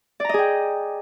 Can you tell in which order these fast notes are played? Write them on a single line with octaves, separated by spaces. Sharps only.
D5 A#5 D#5 G#4 G5